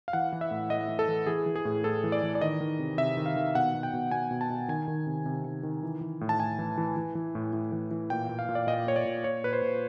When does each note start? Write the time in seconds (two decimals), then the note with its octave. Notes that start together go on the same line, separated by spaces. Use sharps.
0.08 F5
0.13 E3 F#5
0.33 E3
0.41 E5
0.51 A2
0.70 A2 D#5
0.89 E3
0.99 A4
1.08 E3
1.27 E3 G#4
1.46 E3
1.56 G#4
1.65 A2
1.84 A2 A4
2.04 E3
2.12 D5
2.22 E3
2.35 D5
2.41 D#3 D#5
2.61 D#3
2.79 C3
2.98 C3 E5
3.17 D#3
3.26 F5
3.36 D#3
3.55 B2 F#5
3.74 B2
3.83 G5
3.93 B2
4.11 B2 G#5
4.31 B2
4.41 A5
4.50 B2
4.68 D#3 G#5
4.88 D#3
5.06 C3
5.26 C3
5.45 D#3
5.63 D#3
5.83 E3
6.01 E3
6.21 A2
6.29 A5
6.40 A2 G#5
6.59 E3
6.78 E3
6.97 E3
7.15 E3
7.35 A2
7.53 A2
7.72 E3
7.91 E3
8.10 A#2 G5
8.29 A#2
8.39 F5
8.49 A#2
8.55 D5
8.67 A#2 D#5
8.87 A#2 C#5
8.96 D5
9.05 A#2
9.24 A#2 C#5
9.44 A#2 B4
9.53 C5
9.62 A#2